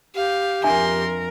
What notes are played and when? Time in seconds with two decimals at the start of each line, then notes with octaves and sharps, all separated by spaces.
0.15 G4 F5
0.64 F2 D4 A#4 E5 G#5 C6